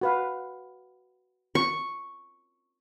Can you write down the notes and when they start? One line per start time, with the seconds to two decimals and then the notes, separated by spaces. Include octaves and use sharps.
0.01 F#4 B4 F5
1.55 C#6